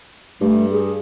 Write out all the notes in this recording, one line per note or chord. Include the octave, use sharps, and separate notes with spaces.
G2 A3
G#4